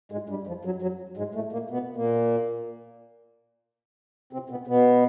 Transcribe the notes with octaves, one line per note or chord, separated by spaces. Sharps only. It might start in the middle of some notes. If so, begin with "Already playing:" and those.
G#2 G#3
G2 G3
F2 F3
F#2 F#3
F#2 F#3
G#2 G#3
A2 A3
A#2 A#3
B2 B3
A#2 A#3
C3 C4
B2 B3
B2 B3